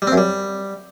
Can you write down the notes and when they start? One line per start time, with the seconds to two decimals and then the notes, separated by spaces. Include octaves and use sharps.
0.02 G3
0.07 C4
0.12 F#2
0.17 G3